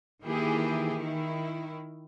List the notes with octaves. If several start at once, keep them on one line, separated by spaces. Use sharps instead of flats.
D#3 E3 A#3 E4 G4 G#4
D#3 E4